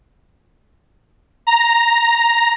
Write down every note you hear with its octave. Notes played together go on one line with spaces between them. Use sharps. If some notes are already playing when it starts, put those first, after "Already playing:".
A#5